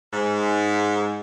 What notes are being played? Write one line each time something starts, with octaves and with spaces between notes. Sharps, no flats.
G#2